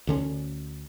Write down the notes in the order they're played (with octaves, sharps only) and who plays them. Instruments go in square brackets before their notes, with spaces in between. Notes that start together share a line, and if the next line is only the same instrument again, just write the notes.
[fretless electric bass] D2 D3 C#4